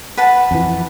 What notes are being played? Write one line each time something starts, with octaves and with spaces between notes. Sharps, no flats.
B4 F#5 A5
F2 E3